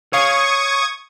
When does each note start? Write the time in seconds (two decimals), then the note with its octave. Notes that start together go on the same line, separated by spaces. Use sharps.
0.13 C#5 F5 C#6 D#6 G#6